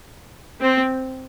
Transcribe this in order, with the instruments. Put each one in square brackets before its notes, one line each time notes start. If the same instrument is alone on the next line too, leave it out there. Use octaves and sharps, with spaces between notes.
[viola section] C4